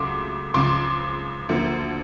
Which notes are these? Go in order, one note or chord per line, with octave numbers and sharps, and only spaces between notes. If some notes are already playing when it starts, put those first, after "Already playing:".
Already playing: C#2 C#3 F#3 A3 C6 D6
C#2 C#3 F3 C6 D6
D2 D3 F3 A#3